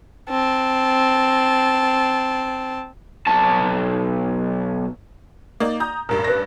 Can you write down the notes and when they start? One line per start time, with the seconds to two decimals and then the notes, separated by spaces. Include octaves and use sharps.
0.29 C4 A5
3.27 B1 A5
5.60 A#3 D#4 D5
5.80 A#5 D#6 G6
6.09 A1 G2 A#4
6.24 B4 A#6